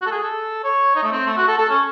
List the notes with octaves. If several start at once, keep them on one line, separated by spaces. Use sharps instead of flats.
F#4
A4
G#4
A4
C#5
D#4
A3
C4
A3
F#4
A4
A4
C#4